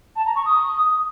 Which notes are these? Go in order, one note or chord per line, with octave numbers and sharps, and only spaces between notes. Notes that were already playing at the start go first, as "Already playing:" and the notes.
A5
A#5
C#6
D#6